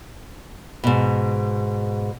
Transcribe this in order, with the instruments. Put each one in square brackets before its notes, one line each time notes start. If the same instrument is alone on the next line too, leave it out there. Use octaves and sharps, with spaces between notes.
[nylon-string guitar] G#2 B2